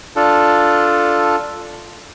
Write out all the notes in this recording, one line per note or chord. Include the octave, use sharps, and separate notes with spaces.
D4 F4 A4